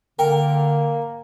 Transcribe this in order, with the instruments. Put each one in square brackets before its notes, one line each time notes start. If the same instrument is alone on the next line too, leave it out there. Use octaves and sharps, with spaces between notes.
[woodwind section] D3 [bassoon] A#3 [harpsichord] A#4 [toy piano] G5